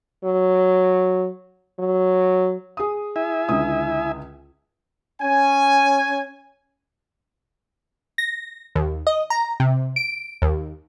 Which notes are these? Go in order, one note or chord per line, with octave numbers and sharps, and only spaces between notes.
F#3
F#3
G#4 D#6
E4 E5 G#5
C#2 D3 D#6
C#4 G#5
A#6
D#2
D#5
A#5
C3
D7
D#2